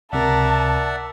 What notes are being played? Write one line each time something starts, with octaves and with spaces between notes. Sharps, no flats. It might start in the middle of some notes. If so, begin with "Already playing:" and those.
C#2 C3 A#4 D5 E5 F#5 A5